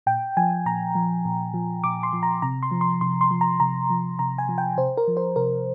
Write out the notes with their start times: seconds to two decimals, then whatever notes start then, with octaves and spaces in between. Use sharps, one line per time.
0.07 A#2 G5
0.37 F3 G#5
0.66 A#2 A#5
0.95 F3
1.25 A#2
1.54 F3
1.84 A#2 D6
2.03 C6
2.13 F3
2.23 A#5
2.42 C3 A#5
2.63 C6
2.71 F3
2.81 C6
3.01 C3 C6
3.21 C6
3.31 F3
3.41 A#5
3.60 C3 A#5
3.90 F3
4.19 C3 A#5
4.38 G#5
4.49 F3
4.58 G5
4.77 C3 C5
4.97 A#4
5.08 F3
5.17 C5
5.36 C3 A#4